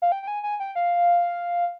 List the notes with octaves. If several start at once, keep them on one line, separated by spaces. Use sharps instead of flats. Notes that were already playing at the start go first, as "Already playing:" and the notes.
F5
G5
G5
G#5
G#5
G5
F5